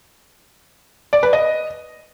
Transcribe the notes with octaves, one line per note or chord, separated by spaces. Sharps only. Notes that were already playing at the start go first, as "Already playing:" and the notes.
D5
B4
D#5